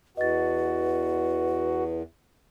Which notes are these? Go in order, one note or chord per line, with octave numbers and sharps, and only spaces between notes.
E2 F#4 B4 D#5 A6